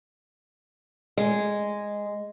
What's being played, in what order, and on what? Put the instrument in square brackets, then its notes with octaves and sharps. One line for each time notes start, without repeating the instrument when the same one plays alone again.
[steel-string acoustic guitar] G#3